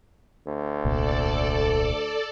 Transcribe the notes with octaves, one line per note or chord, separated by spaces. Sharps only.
D2
D#1 C2 A#2 A4 D5